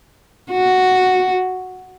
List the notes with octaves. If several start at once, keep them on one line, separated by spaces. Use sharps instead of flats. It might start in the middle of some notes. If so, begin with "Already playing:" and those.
F#4